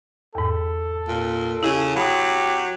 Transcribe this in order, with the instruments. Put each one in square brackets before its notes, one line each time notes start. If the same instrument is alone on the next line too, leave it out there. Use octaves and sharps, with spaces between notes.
[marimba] E2 G#2 [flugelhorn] A4
[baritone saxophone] A#2
[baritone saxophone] C#3 [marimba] E4 G4 G#4
[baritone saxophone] F#3 [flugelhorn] G4 [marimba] B5 D#6